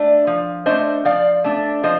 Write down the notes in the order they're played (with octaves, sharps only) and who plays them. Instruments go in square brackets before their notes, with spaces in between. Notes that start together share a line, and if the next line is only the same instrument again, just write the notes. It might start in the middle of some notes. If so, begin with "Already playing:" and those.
Already playing: [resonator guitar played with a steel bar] A3 D4
F3
A3 D4 C5 D#5
F3 D5 F5
A3 D4
F3 C5 D#5